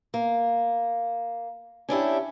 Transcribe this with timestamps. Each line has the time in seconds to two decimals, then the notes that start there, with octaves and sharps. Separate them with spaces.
0.14 A#3
1.89 C#4 D4 E4 G4